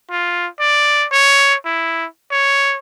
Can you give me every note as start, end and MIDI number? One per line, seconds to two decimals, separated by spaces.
0.11 0.48 65
0.60 1.07 74
1.12 1.55 73
1.65 2.06 64
2.32 2.78 73